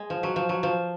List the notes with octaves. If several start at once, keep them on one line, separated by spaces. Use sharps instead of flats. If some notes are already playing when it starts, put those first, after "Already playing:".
Already playing: G#3
F3
F#3
F3
F#3
F3